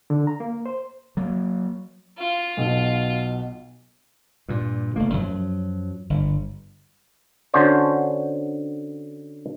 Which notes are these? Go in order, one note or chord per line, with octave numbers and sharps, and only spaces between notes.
D3
A#5
A#3
C5
F#3 A#3
F4
B1 B2
G2 A#2
F1 A3 A#3
F#2 F3 F#3
G1
D3 C#4 F#4 C5 C#5